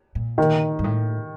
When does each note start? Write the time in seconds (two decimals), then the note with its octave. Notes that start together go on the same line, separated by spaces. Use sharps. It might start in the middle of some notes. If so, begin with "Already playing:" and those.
0.15 A#2
0.38 D#3
0.79 G2
0.84 A2